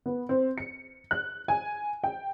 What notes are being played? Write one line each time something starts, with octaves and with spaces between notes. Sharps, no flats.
B3
C4
C#7
F#6
G#5
G5